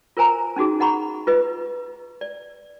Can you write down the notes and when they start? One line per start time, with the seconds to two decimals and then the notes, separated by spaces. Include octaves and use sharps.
0.17 F4 A#4 C5 G#5 A#5
0.56 C#4 D#4 F#4 G#4
0.80 D#5 F#5 A#5 B5 C#6
1.27 F4 B4 D#5
2.21 D5